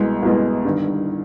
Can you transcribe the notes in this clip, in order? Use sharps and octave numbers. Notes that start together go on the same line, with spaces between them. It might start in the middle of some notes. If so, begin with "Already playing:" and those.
Already playing: C2 B2 G#3
C2 B2 G#3
G1 G2 D#3